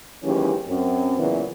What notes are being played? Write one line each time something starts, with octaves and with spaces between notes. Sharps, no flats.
D#2 E3 F#3 G#3 C#4 G4
F#2 C4
A#2 C#3 E3 F#3 B3